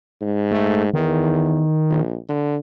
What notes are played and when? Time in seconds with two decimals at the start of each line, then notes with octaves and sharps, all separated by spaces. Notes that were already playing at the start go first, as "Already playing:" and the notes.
0.21 G#2
0.51 A3
0.94 E2 D#3
1.90 A#1
2.29 D3